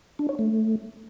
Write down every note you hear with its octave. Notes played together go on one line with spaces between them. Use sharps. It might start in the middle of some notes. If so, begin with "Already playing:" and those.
D4
C#5
A3